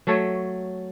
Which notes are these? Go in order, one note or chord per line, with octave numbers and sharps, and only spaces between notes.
F#3 A3 A4 C#5